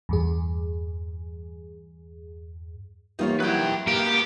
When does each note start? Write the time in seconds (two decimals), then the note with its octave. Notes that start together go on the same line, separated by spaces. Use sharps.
0.09 E2 G2 G#4
3.19 E2 G3 A#3 D#4 F4 C#5
3.40 F#3 D#4 E4 B4 G5
3.87 A#3 B3 G4 A#4